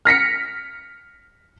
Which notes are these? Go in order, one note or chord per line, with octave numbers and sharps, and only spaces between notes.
F6 A#6 B6 C#7